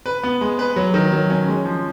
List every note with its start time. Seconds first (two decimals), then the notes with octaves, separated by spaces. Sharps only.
0.06 B4
0.23 B3
0.41 G#3
0.59 B4
0.76 F#3
0.94 D#3
1.12 F#3
1.30 C#4
1.48 G#3
1.65 F3